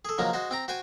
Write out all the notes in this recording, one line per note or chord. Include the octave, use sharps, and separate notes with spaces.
G#4 A4
C#3 F3 F#3 G#3 A#3
G#3 F#4 C5
C4 G5 A#5
F#4 C5 G5 G#5